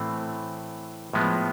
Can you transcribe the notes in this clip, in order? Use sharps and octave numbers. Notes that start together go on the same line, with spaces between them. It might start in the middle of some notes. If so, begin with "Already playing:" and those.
Already playing: A2 E3 A3 C4
A2 F3 G#3 B3